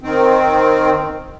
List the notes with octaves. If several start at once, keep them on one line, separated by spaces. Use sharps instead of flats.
D#3 C4